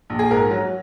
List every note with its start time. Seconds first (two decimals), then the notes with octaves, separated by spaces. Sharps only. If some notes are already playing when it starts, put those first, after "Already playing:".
0.10 A#1
0.19 G#4
0.31 G#2 A#4
0.51 F#3